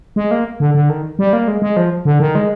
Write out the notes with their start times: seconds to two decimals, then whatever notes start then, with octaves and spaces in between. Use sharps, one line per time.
0.16 G#3
0.31 A#3
0.60 D3
0.74 D3
0.89 D#3
1.19 G3
1.33 A#3
1.48 G#3
1.62 G#3
1.77 F3
2.05 D3
2.20 D#3
2.35 G#3